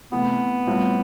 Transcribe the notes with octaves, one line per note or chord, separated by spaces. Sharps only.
C3 E3 A3 B3
A2 G3 C4 F4